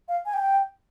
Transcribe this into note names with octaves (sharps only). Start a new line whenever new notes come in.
F5
G#5
G5